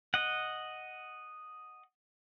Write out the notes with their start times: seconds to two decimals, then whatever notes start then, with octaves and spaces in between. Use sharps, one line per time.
0.14 D#5 F#5